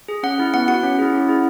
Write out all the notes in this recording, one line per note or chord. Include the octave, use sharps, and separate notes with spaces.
G#4
C#4 F#5
E4 G#4
B3 F#5
F#4 F#5
C#4
E4 G#4
C#4
E4 G#4